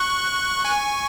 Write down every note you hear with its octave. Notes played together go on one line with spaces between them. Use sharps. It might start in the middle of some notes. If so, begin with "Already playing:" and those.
Already playing: C#6 F#6
G#5 C#6